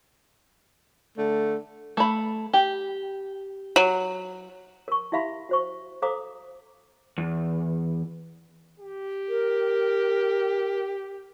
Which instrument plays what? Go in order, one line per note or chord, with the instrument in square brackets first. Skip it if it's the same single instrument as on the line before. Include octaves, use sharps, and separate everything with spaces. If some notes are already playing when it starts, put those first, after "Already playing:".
[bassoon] D3 [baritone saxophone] A3
[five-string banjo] A3 B5
G4
[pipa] F#3
[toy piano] A#4 C#6
E4 G4 E5 F5 B5 C6
F#4 C5 C#6
A4 C5 F5 A#5 D6 D#6
[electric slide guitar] E2
[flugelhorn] G4
[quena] A#4